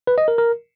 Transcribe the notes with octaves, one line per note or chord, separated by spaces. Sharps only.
B4
D#5
A#4
A#4